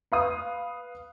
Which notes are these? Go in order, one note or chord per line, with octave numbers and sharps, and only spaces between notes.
B4 F5 D#6